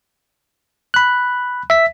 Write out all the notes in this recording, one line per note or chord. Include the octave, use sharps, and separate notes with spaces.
B5 F#6
E5 B6